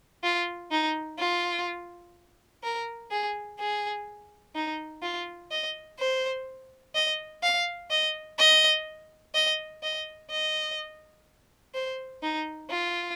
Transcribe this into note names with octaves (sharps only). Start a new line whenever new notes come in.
F4
D#4
F4
A#4
G#4
G#4
D#4
F4
D#5
C5
D#5
F5
D#5
D#5
D#5
D#5
D#5
C5
D#4
F4